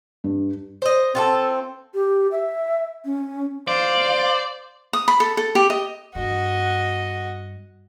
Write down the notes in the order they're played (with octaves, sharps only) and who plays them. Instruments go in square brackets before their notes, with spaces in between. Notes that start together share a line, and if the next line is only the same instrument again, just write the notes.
[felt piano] G2
[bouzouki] C5 D#5
[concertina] C4 [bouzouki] F4 F#4 A4
[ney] G4
E5
C#4
[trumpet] C5 [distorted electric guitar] D5 [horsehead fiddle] F5
[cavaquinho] D#6
B5
A4
A4
G4
D#5
[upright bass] G2 B3 [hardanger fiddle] F#4 D#5